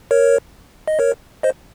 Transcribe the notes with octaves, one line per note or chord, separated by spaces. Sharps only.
A#4 C#5
D#5
A#4 C#5
C5 D#5